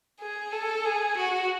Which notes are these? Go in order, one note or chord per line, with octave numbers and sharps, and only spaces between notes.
G#4
A4
G#4
F#4